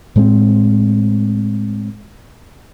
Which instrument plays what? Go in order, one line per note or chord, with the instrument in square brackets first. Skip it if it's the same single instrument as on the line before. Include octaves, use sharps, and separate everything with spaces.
[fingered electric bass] A2 G#3 B3 C4